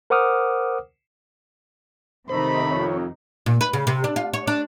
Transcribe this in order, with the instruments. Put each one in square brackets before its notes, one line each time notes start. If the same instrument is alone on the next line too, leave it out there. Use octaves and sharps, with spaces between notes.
[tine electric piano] A#4 C5 F#5 D6 D#6 F6
[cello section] C3 D#3 D#4 [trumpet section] A3 B5 [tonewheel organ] C5
[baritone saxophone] F2 [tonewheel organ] C#5
[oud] A#2
B4
C#3
C3
D4
F4
C#5
D4